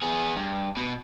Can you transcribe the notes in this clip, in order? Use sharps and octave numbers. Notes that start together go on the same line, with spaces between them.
B3 G#4
G2
B2